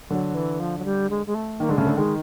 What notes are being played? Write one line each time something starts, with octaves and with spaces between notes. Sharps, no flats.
D3 F#3
E3
F3
F#3
G3
G#3
G#3
A3
D#3 A#3
D3 G#3
C#3 A3
D3
D#3 G#3